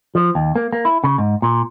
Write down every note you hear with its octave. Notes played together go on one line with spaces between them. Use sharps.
F3
D#2
A#3
A#3
E4
C#3
G#2
A#2